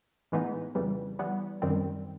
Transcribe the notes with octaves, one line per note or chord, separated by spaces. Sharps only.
A2 E3 G#3 B3 D#4
F2 C#3 E3 G3
E3 G3 B3
F#2 D#3 G3 C4